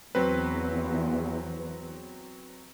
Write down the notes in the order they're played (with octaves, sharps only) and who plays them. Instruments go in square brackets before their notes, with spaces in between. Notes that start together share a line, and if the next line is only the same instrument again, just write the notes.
[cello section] E2 [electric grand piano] F#3 C4 B4